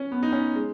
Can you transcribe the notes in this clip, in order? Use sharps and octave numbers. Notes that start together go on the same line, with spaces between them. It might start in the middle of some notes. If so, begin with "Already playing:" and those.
Already playing: C#4
B3
D#4
C#4
G#3